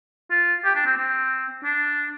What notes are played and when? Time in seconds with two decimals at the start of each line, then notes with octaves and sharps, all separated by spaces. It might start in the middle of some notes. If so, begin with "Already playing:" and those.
0.31 F4
0.65 G4
0.76 D4
0.86 C4
0.98 C4
1.64 D4